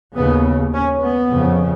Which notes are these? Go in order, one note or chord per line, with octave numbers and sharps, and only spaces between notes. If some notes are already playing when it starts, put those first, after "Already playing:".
D#2 C#3 B3
C#4
B3
F2 C#3